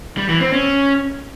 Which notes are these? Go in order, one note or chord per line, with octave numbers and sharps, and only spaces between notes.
G3
E3
C4
C#4